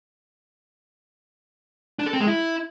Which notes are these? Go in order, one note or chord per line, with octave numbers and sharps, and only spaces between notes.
D4
A4
C4
G#3
E4